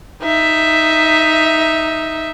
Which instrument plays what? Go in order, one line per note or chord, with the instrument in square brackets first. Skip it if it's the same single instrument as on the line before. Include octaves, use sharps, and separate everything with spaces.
[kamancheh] D#4 E5